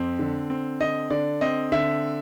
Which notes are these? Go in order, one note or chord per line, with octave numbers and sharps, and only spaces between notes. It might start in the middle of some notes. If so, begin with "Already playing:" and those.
Already playing: F2 C4
D3
C4
D3 D#5
D3 D5
C4 D#5
D3 E5